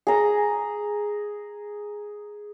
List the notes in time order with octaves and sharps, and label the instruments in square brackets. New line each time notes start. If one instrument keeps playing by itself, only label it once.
[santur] G#4 A#5